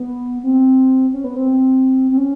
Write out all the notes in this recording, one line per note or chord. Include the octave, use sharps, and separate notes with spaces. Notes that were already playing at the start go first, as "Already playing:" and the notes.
Already playing: B3
C4
C#4
B3
C4
C4
C#4